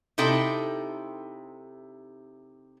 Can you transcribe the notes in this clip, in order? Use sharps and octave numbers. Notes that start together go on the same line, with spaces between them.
C3 D#4 E4 A4 G5